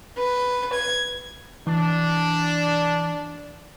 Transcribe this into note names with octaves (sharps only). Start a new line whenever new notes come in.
B4
G#6
E3 D4